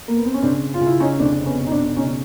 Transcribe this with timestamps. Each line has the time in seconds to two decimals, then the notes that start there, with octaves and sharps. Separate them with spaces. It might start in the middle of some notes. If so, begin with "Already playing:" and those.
0.08 A#3
0.16 B3
0.25 C4
0.34 C#4
0.42 C#3 C4 D4
0.74 F4
0.81 C#3
0.86 E4
1.00 C#4 D#4
1.19 F1 C4 D4
1.46 B3 C#4
1.58 B2
1.67 D#4
1.72 C4 D4
1.96 C#3 C#4 D#4